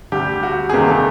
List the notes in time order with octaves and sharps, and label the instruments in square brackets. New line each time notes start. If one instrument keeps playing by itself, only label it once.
[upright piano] D2 D3 G3 G4
F#4
G#4
E2 C3 D#3 G3 A#3 G4
A4